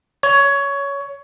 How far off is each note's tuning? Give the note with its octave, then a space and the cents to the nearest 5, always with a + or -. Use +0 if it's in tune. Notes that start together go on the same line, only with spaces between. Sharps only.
C#5 +15